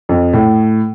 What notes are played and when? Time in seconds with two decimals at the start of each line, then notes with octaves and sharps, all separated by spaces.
0.09 F2
0.33 A2